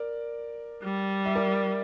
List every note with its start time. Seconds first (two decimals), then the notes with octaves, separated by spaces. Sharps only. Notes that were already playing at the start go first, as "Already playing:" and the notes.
Already playing: A#4 D5
0.83 G3
1.26 E5
1.35 A#4 D5